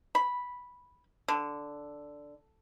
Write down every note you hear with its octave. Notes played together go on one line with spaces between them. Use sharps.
B5
D3